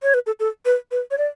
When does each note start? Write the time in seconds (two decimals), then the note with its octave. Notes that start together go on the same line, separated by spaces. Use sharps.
0.03 C#5
0.14 B4
0.26 A4
0.40 A4
0.65 B4
0.91 B4
1.11 C#5
1.18 D5